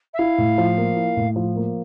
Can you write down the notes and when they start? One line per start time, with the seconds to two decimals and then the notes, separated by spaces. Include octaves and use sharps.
0.13 E5
0.18 E4 F5
0.38 A2
0.58 F3
0.78 A#3
0.96 E4
1.17 A2
1.36 F3
1.56 A#3